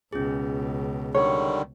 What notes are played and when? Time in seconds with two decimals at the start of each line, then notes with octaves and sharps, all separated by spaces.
0.13 C#2 B2 C#4 F4 G#4
1.15 D3 D#3 G3 C#5